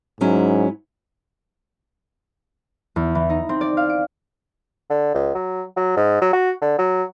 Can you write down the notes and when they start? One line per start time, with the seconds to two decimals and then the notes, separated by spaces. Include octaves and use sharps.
0.21 G#2 F#3 C#4 E4
2.96 E2
3.15 E3
3.30 D#4
3.49 C4
3.61 D5
3.77 F5
3.90 D7
4.90 D3
5.14 C#2
5.35 F#3
5.77 F#3
5.97 G#2
6.21 F#3
6.33 F#4
6.61 D3
6.79 F#3